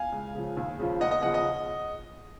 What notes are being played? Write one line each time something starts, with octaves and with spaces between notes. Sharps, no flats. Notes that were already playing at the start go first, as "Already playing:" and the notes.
Already playing: F5 G#5
C#2
C#3 F3
D#2
C#3 F3
D#2 D#5 F#5
D#5
C#3 F3 D#5 F#5
D#5